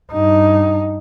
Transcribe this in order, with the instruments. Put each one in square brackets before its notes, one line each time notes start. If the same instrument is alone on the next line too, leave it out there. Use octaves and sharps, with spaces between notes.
[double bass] G2 D#4